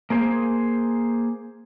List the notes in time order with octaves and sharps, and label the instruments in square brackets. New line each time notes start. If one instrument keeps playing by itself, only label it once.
[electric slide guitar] A#3 G#4 C5